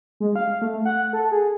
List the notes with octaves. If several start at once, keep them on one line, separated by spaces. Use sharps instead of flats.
G#3
F5
A3
F#5
A4
G#4